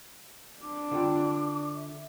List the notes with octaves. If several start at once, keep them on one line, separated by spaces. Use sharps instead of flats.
D4 D6
D3 F4 G5
E5